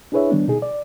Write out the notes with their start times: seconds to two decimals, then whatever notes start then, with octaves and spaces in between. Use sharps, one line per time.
0.12 D4 E4 G#4 B4 C#5 E5
0.30 D#3 G3 B3 D4
0.48 B2 D#4 G#4
0.62 D5